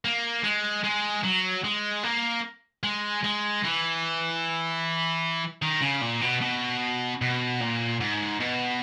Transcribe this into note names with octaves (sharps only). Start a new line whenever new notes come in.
A#3
G#3
G#3
F#3
G#3
A#3
G#3
G#3
E3
D#3
C#3
A#2
B2
B2
B2
A#2
G#2
B2